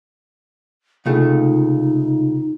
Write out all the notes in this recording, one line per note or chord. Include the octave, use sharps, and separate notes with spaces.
C#2 C3 A3 D#4 F4 G#4